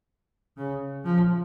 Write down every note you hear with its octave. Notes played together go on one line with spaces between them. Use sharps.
C#3
F3